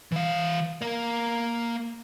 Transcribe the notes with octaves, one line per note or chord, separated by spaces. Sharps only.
E3 F5
A#3 A#4